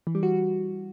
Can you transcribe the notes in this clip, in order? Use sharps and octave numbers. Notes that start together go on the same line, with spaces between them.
E3
G3
F#4